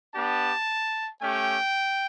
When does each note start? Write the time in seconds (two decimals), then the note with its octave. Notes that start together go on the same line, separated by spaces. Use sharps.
0.15 B3 D4 G4 A5
1.22 A3 C#4 G4 G5